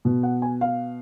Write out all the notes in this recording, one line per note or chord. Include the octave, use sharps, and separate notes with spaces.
B2
F#5
G#5
F5